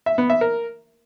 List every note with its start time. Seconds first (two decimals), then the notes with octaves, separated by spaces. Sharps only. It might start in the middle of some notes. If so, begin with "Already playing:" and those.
0.06 E5
0.18 B3
0.30 E5
0.41 A#4